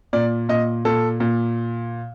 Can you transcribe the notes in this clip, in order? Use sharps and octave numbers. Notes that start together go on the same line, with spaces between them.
A#2 D5
A#2 D#5
A#2 A4
A#2